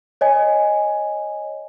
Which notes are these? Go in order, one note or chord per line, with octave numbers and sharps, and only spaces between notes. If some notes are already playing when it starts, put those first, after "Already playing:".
C#5 D#5 G#5